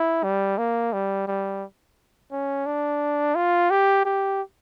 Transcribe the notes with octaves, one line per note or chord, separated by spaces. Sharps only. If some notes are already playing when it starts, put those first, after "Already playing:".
Already playing: E4
G3
A#3
G3
G3
C#4
D4
F4
G4
G4